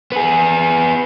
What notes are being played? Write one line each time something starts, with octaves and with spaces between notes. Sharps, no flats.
B3 G#4